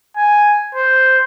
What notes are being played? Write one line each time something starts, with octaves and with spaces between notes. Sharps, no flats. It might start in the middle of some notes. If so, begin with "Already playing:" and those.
G#5
C5